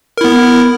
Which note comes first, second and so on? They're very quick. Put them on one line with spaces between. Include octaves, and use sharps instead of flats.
A#4 E4 B3